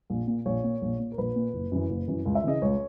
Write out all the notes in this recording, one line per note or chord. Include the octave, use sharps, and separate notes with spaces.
A#1
A#2
A#1 C#5
A#2
A#1
A#2
A#4
A#1 B4
A#2
F#1
F#2 E3
F#1
F#2 E3
C#2
E5
C#3 E3 D#5
C#2 C#5